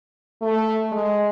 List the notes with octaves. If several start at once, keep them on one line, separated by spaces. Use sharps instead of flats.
A3
G#3